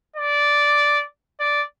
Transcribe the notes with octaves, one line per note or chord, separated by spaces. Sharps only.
D5
D5